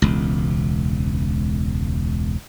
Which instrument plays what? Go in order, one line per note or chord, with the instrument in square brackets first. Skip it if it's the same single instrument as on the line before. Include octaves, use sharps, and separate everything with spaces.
[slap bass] E1 C#2